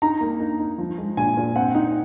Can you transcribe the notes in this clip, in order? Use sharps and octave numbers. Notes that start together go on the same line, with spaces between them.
D#4 A#5
A#3
D#4
D#4
F3
G#3
A#2 G#5
A#2
C4 F#5
D#4